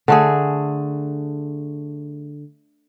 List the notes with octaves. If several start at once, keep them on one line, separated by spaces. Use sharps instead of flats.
D3 A3 G#4